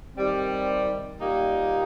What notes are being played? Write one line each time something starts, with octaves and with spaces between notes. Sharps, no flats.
D#3 G3 C4
A#2 G3 A#3 D#4 G4